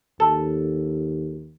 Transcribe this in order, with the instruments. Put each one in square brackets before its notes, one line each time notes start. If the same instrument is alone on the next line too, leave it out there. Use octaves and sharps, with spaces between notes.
[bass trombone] D#2 [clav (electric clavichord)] A4